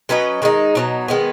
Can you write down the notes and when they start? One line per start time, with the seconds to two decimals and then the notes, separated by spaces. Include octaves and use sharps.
0.09 F#3 C#4 B4 D#5
0.42 D#3 G#3 D#4
0.75 B2 F#3 D#4
1.08 D#3 G#3 B3